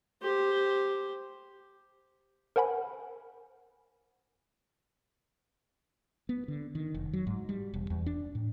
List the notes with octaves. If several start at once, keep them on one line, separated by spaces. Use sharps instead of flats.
G4 C5
A#4 C5 F#5 G#5 B5
B3
D3
D#3
F1
F#3
G#2
G3
E1
E2
D4
A2